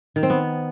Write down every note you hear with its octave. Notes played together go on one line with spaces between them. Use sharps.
D#3
C4
B3